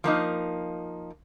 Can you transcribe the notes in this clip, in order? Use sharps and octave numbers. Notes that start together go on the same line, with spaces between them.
F3 A#3 D#4